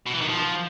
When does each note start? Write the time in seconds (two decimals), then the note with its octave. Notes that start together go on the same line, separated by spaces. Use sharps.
0.06 B2
0.14 E3
0.21 D#3
0.28 F3